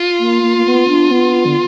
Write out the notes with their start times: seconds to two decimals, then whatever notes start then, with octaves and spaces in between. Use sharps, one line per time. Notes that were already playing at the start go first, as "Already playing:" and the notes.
Already playing: F4
0.20 A#3
0.43 A#3
0.58 A#3
0.66 B3
0.88 D4
1.11 B3
1.46 D3